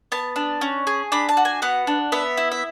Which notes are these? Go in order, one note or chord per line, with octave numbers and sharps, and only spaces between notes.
B3 A5
D4
C#4
G#4
D4 B5
A5
F#4
G#5
B3 F#5
D4
B3 E5
E4
E5